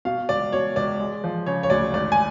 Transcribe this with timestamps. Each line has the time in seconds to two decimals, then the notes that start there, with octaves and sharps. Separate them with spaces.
0.05 B2 F5
0.29 C#2 D5
0.52 B2 C#5
0.76 C#2 D5
1.00 G#3
1.24 F3
1.46 C#3 C#5
1.63 C#5
1.70 D2 D5
1.93 G#1 D5
2.12 G#5